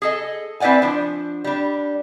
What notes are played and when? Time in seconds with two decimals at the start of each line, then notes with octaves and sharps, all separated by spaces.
0.02 G#4 A4 D#5
0.60 C4 E4 B4 D5 F#5 G#5
0.82 F3 D4
1.44 G3 D4